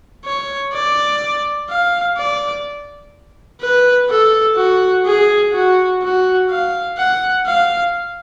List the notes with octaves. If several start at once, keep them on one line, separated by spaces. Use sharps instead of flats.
C#5
D5
F5
D5
B4
A4
F#4
G#4
F#4
F#4
F5
F#5
F5